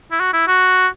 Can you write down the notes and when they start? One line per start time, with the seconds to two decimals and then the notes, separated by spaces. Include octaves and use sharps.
0.11 E4
0.20 F#4
0.33 E4
0.48 F#4